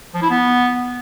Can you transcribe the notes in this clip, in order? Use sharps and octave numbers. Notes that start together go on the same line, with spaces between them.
F3
E4
B3